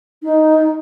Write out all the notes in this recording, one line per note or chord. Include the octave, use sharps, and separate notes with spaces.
D#4